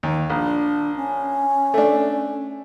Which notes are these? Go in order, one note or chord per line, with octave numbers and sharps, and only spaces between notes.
D#2
A#1 D4
C#4
A3 D4